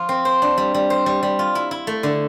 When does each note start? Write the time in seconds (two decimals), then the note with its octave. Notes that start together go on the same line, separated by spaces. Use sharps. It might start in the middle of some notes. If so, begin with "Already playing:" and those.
Already playing: F3 F4
0.09 C4
0.25 C5
0.42 D4
0.57 G3
0.74 G3
0.90 C5
1.06 G3
1.23 G3
1.39 F4
1.55 E4
1.71 E4
1.87 A3
2.03 D3